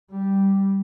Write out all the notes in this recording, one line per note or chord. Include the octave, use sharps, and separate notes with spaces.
G3